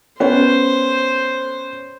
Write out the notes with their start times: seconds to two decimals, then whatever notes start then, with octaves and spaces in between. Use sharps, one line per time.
0.20 B3 C#4 C5